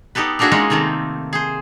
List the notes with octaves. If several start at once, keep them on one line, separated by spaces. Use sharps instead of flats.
B3 D#4 G4 A4 B4
A3 A#3 D4 F#4 G#4 E5
G#3 A#3 C#4 D#4 F4
C3 D#3 A3 A#3 C4
G#4 C5